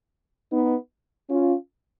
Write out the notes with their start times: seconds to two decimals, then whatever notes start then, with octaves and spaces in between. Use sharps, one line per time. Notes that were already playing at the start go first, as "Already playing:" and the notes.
0.51 B3 D#4
1.30 C#4 F4